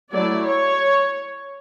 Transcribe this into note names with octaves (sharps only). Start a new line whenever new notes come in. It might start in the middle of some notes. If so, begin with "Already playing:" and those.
F#3 A3 E4 D5
C#5